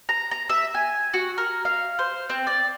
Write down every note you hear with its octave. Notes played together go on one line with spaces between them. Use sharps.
A#5
A#5
E5
G#5
F#4
A#4
F5
C5
C4
D5